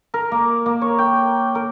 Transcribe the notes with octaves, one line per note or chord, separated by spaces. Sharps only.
A#4
A#3
A#3
C#5
G5
A#4